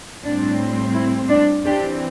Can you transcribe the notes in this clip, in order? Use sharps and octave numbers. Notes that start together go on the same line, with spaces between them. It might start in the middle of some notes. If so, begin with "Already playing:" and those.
A2 G3 C4 D4
E4
D4
E3 C4 D4 G4